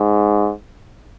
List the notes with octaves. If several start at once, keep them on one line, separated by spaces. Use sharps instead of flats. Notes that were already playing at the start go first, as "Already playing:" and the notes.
Already playing: G#2